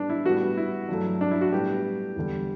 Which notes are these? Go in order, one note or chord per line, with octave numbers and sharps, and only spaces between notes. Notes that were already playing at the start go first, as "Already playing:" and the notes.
Already playing: A2 G3 B3 D4
E4
A2 G3 B3 F#4
E4
G2 F#3 A3
D4
E4
F#4
A2 G3 B3 G4
E2 D3 G3